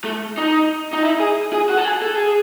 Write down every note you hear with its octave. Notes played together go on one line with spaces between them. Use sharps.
A3
D#4
D#4
E4
G#4
G#4
F#4
A4
G#4
A4
G#4